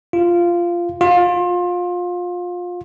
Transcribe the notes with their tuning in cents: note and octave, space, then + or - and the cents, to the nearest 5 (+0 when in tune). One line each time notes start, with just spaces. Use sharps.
F4 -10
F4 +25